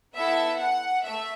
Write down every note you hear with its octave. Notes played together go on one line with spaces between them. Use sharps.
B3 E4 A4 E5
F#5
A3 E5